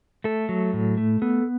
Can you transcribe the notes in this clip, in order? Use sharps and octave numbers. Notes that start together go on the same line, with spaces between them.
A3 A4
F#3
A2
A3
B3 A4